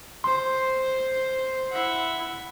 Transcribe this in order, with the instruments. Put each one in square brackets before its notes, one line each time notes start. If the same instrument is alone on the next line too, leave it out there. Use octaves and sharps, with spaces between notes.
[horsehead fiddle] C5 [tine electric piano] C6
[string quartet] E4 E5 F#5